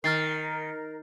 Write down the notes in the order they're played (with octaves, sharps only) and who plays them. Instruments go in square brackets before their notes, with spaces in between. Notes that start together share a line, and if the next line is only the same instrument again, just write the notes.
[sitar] D#3 [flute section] A#4 [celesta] F6 A6 C7